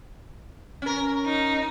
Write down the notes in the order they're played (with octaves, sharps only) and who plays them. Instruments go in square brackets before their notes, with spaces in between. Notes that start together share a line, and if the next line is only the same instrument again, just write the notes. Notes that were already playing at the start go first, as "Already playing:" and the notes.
[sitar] C#4 A#4
[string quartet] D#4